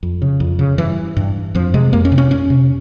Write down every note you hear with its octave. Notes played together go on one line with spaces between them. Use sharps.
F2
C#3
F2
C#3
G2 E3
G2
F2 F3
C3 G#3
F2 A#3
C#4
C3
C#4
F2 C#4
C3